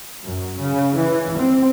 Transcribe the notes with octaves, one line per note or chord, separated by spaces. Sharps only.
F#2
C#3
E3
C4